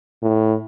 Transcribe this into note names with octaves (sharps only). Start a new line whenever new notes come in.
A2